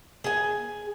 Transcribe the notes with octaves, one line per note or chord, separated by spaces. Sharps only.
G#4 G#5